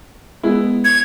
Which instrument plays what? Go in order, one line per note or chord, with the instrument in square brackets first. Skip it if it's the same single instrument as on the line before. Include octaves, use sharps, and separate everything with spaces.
[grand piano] G#3 B3 E4
[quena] G#6